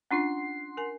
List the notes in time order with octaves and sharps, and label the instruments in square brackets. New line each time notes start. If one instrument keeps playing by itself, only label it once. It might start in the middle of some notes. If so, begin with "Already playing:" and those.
[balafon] C#4 D4 F4 [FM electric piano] F#5 C6 C7
[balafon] A#4 G#5